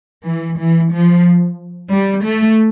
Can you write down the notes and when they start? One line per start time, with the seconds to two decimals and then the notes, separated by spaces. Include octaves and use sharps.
0.24 E3
0.58 E3
0.91 F3
1.91 G3
2.24 A3